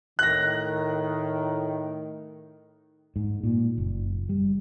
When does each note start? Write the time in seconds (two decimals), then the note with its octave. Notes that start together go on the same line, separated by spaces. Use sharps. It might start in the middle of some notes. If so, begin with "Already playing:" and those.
0.19 A2 D#3 F#6 A#6
3.16 G#2
3.43 A#2
3.78 F#1
4.29 G3